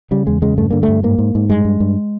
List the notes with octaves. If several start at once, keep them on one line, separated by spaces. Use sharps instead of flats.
C#3 G3
E2 G#3
C#3 G#3
G2 A3
D3 A#3
A3
G2
G#2 A#3
G#2
G#2
G2 G#3
G2
G2